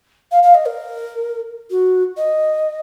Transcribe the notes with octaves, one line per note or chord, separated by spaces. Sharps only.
F5
F5
D#5
A#4
F#4
D#5